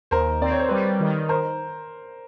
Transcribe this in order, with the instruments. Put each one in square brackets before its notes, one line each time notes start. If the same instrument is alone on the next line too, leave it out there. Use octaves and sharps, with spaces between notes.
[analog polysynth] D#2 [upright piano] A#4 C5
[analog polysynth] C4 [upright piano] D5
[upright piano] C#5
C5
[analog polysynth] G3 [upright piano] B4 C#5
[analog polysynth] D#3
[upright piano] A#4 C5